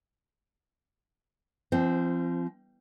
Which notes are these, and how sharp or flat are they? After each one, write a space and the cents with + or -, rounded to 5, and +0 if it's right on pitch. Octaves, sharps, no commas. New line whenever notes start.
F3 -30 C4 +0